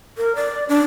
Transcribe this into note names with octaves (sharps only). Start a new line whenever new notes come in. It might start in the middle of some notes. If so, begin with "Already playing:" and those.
A#4
D5
D4